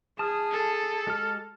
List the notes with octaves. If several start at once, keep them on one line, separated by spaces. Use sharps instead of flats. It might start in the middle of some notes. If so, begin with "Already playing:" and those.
G#4 A5 D#6 F6
A4
G#3 G4 F6